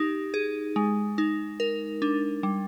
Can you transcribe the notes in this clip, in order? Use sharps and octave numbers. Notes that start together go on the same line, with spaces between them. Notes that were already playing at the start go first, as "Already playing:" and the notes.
Already playing: D#4 G4
G#4
G#3
D#4
A#4
D4
G3